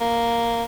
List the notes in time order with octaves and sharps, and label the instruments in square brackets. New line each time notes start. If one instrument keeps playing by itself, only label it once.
[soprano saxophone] A#3